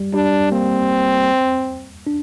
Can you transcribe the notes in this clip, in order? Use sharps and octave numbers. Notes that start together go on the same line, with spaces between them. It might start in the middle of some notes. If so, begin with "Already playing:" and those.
Already playing: G3
G3 D4
A#3 C4
D4